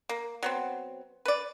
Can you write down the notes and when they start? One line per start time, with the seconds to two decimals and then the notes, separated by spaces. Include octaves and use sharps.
0.09 A#3
0.43 F#3 B3 C4
1.25 B4 D5